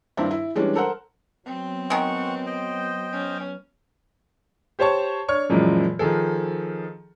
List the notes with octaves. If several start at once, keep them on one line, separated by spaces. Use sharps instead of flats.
G2 D#3 C4 D4 E4
E4
E3 G3 G#3 C#4 D4
A4 A#4 C5 F#5
F#3 B3 C4
D#3 G#3 F#5 C#6
C5 D#5 G5
C#4
G4 C5 C#5 A5 C#6
D4 C#5 C#6 F6
F#2 A#2 E3 F3 G#3
D#3 F3 G#4 A4